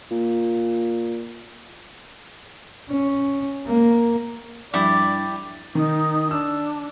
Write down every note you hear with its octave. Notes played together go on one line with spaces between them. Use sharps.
A#2
C#4
A#3
G2 F3 G3 D4 E4 G4 D5
D#3 D#4
D4 E6